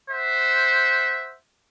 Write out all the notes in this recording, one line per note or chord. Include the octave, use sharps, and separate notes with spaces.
C5 E5 F#5